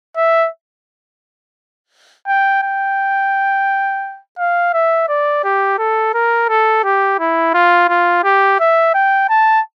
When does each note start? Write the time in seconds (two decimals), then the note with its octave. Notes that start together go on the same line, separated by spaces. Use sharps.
0.17 E5
2.27 G5
2.63 G5
4.39 F5
4.73 E5
5.08 D5
5.44 G4
5.78 A4
6.14 A#4
6.49 A4
6.84 G4
7.19 E4
7.54 F4
7.89 F4
8.24 G4
8.60 E5
8.94 G5
9.29 A5